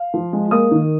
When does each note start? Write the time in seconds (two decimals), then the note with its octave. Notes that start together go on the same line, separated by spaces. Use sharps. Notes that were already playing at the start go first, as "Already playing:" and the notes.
Already playing: F5
0.14 F3
0.33 G#3
0.51 A#3 D#6
0.71 D#3